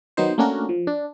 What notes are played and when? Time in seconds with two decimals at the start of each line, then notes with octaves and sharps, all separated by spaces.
0.17 D#3 F#3 B3 D#4 C5
0.38 A3 A#3 C#4 D4 F#4 A#4
0.69 F3
0.87 D4